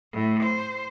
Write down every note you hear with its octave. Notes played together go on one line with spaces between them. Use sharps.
A2
C5